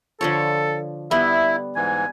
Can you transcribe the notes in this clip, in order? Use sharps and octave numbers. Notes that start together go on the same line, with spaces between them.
D3 F3 A4 C#5
G3 B3 E4 E5
G#2 E3 G#5